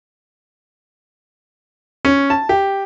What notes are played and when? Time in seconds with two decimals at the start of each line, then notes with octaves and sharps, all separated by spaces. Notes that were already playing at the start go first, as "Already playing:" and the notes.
2.05 C#4
2.30 A5
2.49 G4